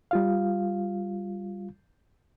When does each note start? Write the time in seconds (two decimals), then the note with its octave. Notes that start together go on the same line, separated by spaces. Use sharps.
0.11 G3 F4 F5